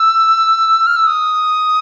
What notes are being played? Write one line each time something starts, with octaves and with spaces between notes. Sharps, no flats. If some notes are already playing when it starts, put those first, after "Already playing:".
Already playing: E6
F6
E6
D#6